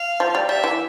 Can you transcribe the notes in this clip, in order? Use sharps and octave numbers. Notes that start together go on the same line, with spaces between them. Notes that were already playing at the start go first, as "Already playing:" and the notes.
Already playing: F5
F3
G3
G3 E5
E3